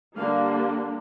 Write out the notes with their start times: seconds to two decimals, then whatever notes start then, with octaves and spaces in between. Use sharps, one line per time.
0.16 D3 G3 A#3 D4 F5